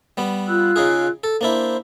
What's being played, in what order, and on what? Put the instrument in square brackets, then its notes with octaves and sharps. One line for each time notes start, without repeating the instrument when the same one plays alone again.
[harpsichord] G3 B3
[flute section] F4 E6 F#6
[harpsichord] C#3 D#4 G#4
A4
[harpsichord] A#3 D4 E4 [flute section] C5